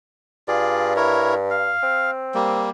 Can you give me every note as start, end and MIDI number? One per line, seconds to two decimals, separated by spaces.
0.48 1.76 43
0.48 0.93 65
0.48 0.93 68
0.48 0.93 74
0.96 1.34 64
0.96 1.34 70
0.96 1.34 73
1.50 2.11 77
1.83 2.65 60
2.35 2.70 55
2.35 2.70 58